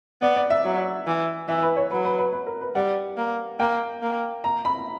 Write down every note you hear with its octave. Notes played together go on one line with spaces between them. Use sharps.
B3 D5
D5
E5
F#3
E3
E3 E5
B4
C#5
F#3 B4
B4
B4
B4
A#4
B4
G3 F#5
A#3
A#3 G5
A#3
A#5
B5